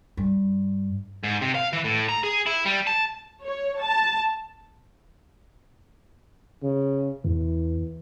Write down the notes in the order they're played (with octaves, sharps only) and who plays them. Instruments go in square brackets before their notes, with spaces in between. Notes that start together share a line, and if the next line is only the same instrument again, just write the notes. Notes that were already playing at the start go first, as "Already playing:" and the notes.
[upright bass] G2
[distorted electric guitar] G#2
C3
F5
E3
A2
A#5
G#4
E4
G3
A5
[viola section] C#5
A5
[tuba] C#3
[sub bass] E2 [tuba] E3